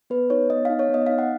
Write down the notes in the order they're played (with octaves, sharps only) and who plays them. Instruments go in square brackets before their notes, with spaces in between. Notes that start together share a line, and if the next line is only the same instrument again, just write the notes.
[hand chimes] B3 B4
D#4 C#5
B3 D#5
D#4 F5
C#5
B3 D#5
D#4 F5
F#5